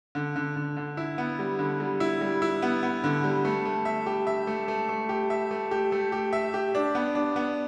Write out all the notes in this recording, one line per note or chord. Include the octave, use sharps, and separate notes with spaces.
D3
D3
D3
D3
E4
B3
G3
D3
G3
E4
G3
E4
B3
B3
D3
G3
A3
A3
E5
G4
E5
A3
A3
A3
G4
E5
A3
G4
A3
G4
E5
G4
D4
B3
D4
B3